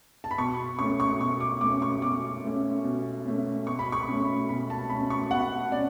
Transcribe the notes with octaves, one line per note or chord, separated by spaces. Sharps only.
A5
B5
B2 C#6
A3 C#4 C#6
C#6
B2 C#6
D6
A3 C#4 D6
C#6
B2 D6
A3 C#4
B2
A3 C#4
B2 C#6
B5
C#6
A3 C#4
B2 B5
A5
A3 C#4 B5
C#6
B2 F#5
C#4 D5